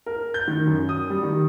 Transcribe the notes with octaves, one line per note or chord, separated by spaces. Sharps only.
A#4
G6
D#3
F#2
D#6
G3
D#3